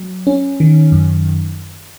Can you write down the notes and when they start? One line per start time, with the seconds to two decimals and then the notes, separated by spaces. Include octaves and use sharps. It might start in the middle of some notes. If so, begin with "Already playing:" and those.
Already playing: F#3
0.27 C#4
0.60 D#3
0.92 F#2